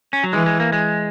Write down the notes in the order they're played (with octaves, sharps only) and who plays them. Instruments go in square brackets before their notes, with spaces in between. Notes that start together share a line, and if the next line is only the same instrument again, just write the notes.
[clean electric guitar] C#4
F#3
[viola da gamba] E3 [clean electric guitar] G#3
[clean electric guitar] G#3
A#3
G#3